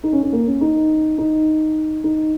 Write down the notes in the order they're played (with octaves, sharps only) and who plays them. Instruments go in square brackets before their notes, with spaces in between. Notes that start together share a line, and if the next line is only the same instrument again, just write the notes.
[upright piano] D#4
C#4
C#4
A#3
C#4
D#4
D#4
D#4